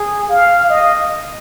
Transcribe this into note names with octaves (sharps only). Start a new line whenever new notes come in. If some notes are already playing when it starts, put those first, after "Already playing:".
Already playing: G#4
F5
D#5